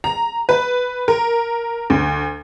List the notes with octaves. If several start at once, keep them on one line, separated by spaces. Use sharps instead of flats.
A#5
B4
A#4
D2